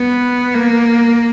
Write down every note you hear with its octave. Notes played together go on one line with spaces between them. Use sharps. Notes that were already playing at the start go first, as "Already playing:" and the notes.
Already playing: B3
A#3